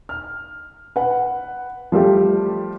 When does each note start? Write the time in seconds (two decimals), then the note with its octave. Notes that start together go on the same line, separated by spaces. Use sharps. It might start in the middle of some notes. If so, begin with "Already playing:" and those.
0.09 F6
0.96 B4 F#5
1.92 F3 G3 A3 G4